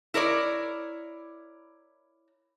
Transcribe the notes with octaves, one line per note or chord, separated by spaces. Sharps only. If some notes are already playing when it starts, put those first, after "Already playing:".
E4 A#4 C#5 D5